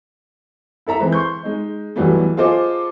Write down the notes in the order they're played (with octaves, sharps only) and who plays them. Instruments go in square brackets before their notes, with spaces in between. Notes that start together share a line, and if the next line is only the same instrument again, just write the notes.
[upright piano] E4 A4 E5 A#5
E3 G#3 C4
C6 C#6 G6
G#3 D#4
B1 B2 E3 F#3 G3 A3
F4 G#4 A4 C5 D#5 D6